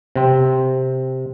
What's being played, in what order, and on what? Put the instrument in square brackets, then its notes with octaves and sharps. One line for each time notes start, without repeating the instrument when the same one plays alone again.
[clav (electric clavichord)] C3 C4